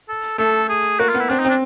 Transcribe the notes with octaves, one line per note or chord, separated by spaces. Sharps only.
A4
A3 A4
G#4
A#3 F#4
F4
B3
E4
C4 D4
D#4
C4 D4